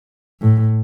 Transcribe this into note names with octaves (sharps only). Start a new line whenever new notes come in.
A2